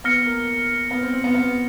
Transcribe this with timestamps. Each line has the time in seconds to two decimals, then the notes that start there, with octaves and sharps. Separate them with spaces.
0.04 B3 F6 A#6 C#7
0.26 A#3
0.91 B3
1.02 C4
1.13 C4
1.24 B3
1.35 B3